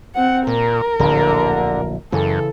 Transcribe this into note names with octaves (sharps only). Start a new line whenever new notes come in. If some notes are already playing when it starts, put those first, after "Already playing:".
C4 F#5
A#2 A#4
D1 A#1 D3
F#2 C#3 E3 A4